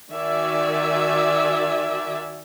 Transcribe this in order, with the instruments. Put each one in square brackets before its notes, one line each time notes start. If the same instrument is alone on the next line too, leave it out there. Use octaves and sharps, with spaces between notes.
[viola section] D#3 F#4 D5 E5 G#5